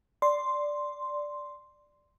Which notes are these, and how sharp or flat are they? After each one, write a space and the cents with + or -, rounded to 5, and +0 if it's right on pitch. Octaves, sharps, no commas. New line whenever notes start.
D5 +0 C6 +0